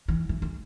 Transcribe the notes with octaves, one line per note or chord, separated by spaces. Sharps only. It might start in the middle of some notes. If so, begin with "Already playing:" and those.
E3
E3
E3